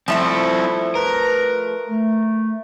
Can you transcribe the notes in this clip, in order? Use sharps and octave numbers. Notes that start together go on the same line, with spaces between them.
F3 A3 C4 E4 C5
A#4 B4
A3